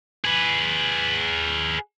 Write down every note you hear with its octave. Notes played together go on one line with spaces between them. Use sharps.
G#4 B4